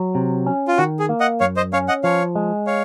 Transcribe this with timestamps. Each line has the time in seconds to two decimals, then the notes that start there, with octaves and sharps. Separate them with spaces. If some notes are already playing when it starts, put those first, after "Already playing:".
Already playing: F#3
0.15 C3
0.46 C#4
0.68 F4
0.78 D#3 F#4
0.99 G#4
1.09 A#3
1.20 D#5 F#5
1.40 F#2 C#5 F5
1.56 C5 D#5
1.73 C#4 C#5 F5
1.88 D#5 F#5
2.03 F3 C#5 F5
2.36 G#3
2.67 C#5 F5